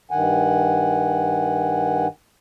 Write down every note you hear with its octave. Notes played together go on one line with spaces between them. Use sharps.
G2 D#3 F#5 G#5